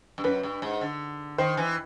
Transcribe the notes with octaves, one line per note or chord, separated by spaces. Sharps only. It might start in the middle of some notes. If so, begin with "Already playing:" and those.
G2
F#2 B4
G2
G#2
D3
D#3 C5
E3